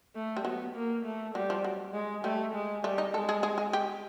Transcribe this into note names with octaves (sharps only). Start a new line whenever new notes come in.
A3
G3
F#3 B3
A#3
A3
F#3 G3
F3
F#3
G#3
G3 A3
G#3
G3 A3
D#4
G#3 A4
G#4
G#4
G#4
G4